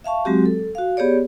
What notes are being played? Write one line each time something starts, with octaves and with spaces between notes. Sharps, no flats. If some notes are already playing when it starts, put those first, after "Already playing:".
E5 F5 A5 C#6
F#3 G#3 C4 F#4 G4
A4
F#4 F5
B3 G4 G#4 C#5 D5